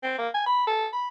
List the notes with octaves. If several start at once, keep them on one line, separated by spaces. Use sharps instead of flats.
C4
A#3
G#5
B5
A4
B5